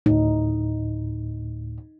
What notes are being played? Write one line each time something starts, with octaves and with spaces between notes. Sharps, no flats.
D2 A2 D#4